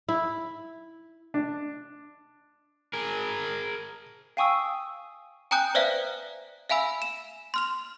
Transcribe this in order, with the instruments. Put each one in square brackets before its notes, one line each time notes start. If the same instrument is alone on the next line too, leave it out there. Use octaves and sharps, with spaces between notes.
[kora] E4
[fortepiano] D4
[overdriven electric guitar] G#4 A#4
[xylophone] F5 G5 G#5 C#6 D#6 E6
G5 G#5 A#5 D#6 F#6 G6
B4 C5 D5 E5 F5 F#6
E5 F5 G#5 B5 E6
E7
C6 F6 F7